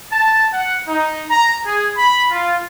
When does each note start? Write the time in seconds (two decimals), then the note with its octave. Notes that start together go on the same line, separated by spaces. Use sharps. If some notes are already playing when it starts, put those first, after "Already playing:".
0.10 A5
0.53 F#5
0.88 D#4
1.29 A#5
1.65 G#4
1.97 B5
2.31 F4